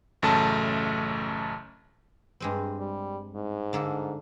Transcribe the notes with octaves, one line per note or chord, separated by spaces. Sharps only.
A1 F#2 C#3 A3 A5
G2 G#3 C4
G3
G#2
D3 A#3 A4